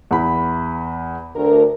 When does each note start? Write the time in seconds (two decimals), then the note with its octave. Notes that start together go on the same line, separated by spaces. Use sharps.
0.11 E2 B5
1.35 D2 A#4